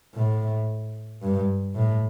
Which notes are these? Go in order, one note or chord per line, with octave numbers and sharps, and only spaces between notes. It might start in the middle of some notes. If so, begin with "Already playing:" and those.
A2
G2
A2